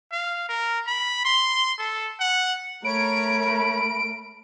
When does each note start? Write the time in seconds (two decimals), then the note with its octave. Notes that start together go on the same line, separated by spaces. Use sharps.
0.12 F5
0.49 A#4
0.87 B5
1.25 C6
1.79 A4
2.20 F#5
2.84 A3 A#4 C#5 B5 D7